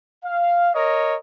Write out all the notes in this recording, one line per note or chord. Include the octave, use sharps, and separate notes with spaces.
F5
A#4 C#5 D#5